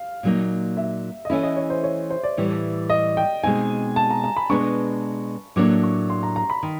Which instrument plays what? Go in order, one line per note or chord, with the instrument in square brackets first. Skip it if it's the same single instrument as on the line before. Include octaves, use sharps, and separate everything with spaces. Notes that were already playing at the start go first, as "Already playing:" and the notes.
Already playing: [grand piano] F5
[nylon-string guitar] A#2 F#3 A#3 D#4
[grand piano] E5
D#5
[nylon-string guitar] E3 A3 C#4 E4 [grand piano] E5
[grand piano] D#5
C#5
C5
C#5
C5
D5
[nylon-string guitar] A2 E3 G3
[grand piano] D#5
G5
[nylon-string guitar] B2 G#3 C4 D#4 [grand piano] G#5
[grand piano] A5
A#5
A#5
B5
[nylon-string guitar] B2 G#3 B3 D4 [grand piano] C#6
[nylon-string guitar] A2 F#3 A#3 D4 [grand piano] D6
[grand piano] C#6
C6
A#5
A#5
B5
[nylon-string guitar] D#3